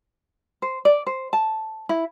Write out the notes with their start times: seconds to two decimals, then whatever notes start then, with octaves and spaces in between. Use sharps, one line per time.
0.62 C5
0.85 D5
1.07 C5
1.33 A5
1.89 E4